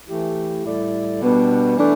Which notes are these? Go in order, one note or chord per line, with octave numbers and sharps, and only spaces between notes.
E3 A3 E4 G4
A2 G3 E4 A4 D5
B2 G3 B3 D4
E3 A3 D4